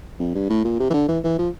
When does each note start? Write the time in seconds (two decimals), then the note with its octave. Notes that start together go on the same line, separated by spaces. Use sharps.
0.20 F2
0.35 G2
0.50 A2
0.64 A#2
0.80 C3
0.90 E3
0.94 D3
1.09 E3
1.24 E3
1.39 F3